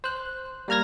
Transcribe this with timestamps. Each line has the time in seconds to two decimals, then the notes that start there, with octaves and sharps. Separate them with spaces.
0.04 C5 F#6
0.68 G3 A#3 A#5 F6 G#6 A#6